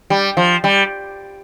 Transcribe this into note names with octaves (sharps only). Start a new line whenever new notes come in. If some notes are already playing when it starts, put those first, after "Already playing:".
G3
F3
G3